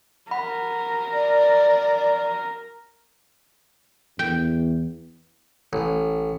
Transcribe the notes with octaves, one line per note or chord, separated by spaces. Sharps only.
A#4 F#5 B5
D5
E2 G5
A1